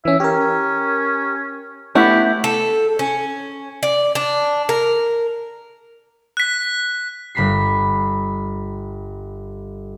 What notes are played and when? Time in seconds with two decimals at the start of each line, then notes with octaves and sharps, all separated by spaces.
0.05 E3 C#4 E5
0.20 C#4 G4 A#4
1.95 A3 B3 E4 G4 F#5
2.44 A4
2.99 C#4
3.83 D5
4.15 D4
4.69 A#4
6.37 F#6 B6
7.35 G1 B5 B6 C7